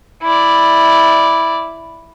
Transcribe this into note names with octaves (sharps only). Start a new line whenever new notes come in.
E4 D5